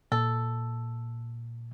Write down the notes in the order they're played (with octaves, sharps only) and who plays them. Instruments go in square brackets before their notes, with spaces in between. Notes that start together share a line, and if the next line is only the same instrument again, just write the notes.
[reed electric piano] A#2 [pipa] A4